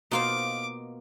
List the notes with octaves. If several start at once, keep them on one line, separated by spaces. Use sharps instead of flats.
B2 A#3 D#4 F4 C5 D6